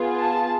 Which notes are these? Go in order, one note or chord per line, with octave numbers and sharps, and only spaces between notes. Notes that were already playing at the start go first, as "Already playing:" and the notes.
Already playing: B3 F4 G#4
A5